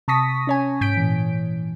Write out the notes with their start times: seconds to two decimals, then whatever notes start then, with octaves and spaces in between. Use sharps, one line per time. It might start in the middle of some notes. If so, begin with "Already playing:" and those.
0.08 C3 A5 C#6 D#6 A#6 B6
0.47 C#4 C#5 G#5
0.81 G#2 G6 B6 D7
0.97 A#2 E3